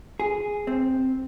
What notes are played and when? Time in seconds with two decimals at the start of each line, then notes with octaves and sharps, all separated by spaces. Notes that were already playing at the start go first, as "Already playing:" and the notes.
0.20 G#4
0.67 C4